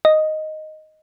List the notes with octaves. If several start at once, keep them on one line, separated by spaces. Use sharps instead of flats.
D#5